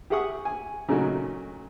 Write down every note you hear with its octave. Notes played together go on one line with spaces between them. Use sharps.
G4 G#4 E5 F#5 C#6 D#6
G#5
A#2 C#3 F#3 A3 D#4 F#4